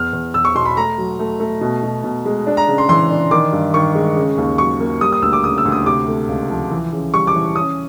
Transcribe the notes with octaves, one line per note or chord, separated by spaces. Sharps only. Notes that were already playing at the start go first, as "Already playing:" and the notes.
Already playing: E2 F6
E2
E2 E6
C#6
B2 C6
B5
A3 A#5
F#3
A3
A3
B2
B2
B2
G#3
D4
A#5
C#3
C6
E3 C6
D4
D#3 D6
G2
D#3 C#6
G#3
C#3
D#2
F#3 C#6
A#3
G3 D#6
D#6
D2 E6
D6
C#3 D#6
E6
D2
D#6
C3 D6
A3
C#2
F3
E3
C#3
G3 C#6
D6
E3
C#4 D#6